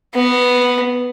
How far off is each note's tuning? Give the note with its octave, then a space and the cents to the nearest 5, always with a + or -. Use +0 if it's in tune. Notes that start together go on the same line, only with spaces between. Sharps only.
B3 +0